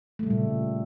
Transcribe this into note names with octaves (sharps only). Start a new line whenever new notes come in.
A#2 C#3 G3 A3